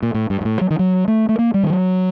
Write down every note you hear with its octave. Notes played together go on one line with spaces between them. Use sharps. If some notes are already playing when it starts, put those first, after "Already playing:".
A#2
A2
G2
G2
A2
F#3
D#3
F#3
A3
A3
A#3
G3
D#3
F#3